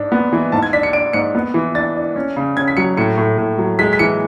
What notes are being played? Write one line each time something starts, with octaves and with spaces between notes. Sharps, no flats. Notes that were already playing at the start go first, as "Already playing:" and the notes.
Already playing: G#2 D4
B3
E3
G#2 A5
G#6
D4 B6
C#7
D4 D7
G#2 C#7
B3
E3
D4 A6
D4
C#4
C#3
C#4 G#6
B6
F#3 C#7
A2 C#7
A2
A2
F#3
G#3 B6
B6
E3 C#7